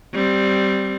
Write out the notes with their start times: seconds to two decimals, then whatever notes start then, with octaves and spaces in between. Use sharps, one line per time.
0.14 G3 C4